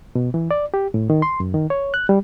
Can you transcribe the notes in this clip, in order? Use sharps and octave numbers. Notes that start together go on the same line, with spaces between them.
B2
E3
D5
G4
A2
D#3
C6
F#2
D#3
C#5
F#6
G3